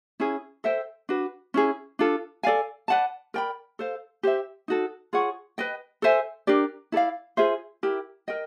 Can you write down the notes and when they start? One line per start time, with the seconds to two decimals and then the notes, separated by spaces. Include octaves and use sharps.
0.20 C#4 E4 G#4
0.64 A4 C5 E5 G5
1.09 D4 F#4 B4
1.54 C#4 E4 G#4
1.99 D4 F4 A4
2.43 A4 D5 F5 G#5
2.88 B4 D5 F#5 A5
3.34 A#4 D5 G5 B5
3.79 A4 C5 F5
4.23 G4 C5 E5
4.68 D#4 F#4 A4
5.13 F4 G#4 C#5 F#5
5.58 B4 D#5 G5
6.02 A4 C5 E5 G#5
6.47 D4 G4 A#4 D5
6.92 E4 A4 D5 F5
7.37 F4 G#4 C5 E5
7.83 E4 G4 A#4
8.28 A#4 D#5 G5